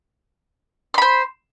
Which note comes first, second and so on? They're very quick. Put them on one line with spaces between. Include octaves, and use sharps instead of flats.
C6 B5 C5